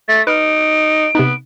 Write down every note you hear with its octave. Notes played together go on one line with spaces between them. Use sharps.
A3 A6
D#4 B4 F6 D7
C3 B3 D#4